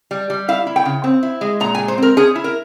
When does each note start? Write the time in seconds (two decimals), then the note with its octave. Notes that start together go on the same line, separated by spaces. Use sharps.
0.11 G3
0.30 G3
0.48 E4 F5
0.67 E4
0.76 G5
0.85 C#3
1.04 C4
1.23 E4
1.41 G#3
1.60 A#2 A#5
1.75 G#5
1.79 G#3
1.88 C5
1.98 C4 A#4
2.17 C#4 G#4
2.35 E4
2.44 A#4